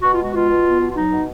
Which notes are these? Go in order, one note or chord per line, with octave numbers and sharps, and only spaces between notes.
B2 F#4
F4
G#3 F#4
B2 F4
B2
B3
B2
F4
F#3 D#4
B2